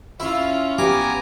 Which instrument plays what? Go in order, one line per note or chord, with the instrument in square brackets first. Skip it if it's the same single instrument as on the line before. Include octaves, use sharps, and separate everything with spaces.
[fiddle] C#4 F4 [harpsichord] E4
[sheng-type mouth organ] B3 G#5 A#5 [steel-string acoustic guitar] G4 [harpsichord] D6